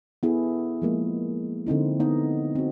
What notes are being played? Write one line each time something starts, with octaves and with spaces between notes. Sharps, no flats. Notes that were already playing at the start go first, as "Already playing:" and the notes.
B3 E4 G#4 A4
F3 G#3 A#3
D3 C4 D#4 E4
B3 D#4 D#5
C4 F#4